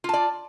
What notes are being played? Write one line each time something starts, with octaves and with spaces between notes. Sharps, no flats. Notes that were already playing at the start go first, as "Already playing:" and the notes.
F4 D5 A5